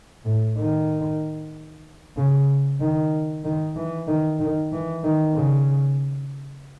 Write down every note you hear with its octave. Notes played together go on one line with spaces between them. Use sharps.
A2
D#3
C#3
D#3
D#3
E3
D#3
D#3
E3
D#3
C#3